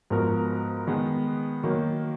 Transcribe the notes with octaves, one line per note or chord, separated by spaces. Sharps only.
G#2 F3 B3 F#4 A#4
D#3 G#3 B3
D#3 F#3 A#3